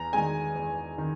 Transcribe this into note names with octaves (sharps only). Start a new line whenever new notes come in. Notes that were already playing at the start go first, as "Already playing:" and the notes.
Already playing: E2 A#5
D#3 G#3 G#5
E2
D#3